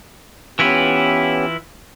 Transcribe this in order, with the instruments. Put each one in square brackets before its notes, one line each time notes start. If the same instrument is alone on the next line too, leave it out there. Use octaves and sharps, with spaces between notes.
[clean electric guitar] E3 E4 F4 [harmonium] B3 C#4 G4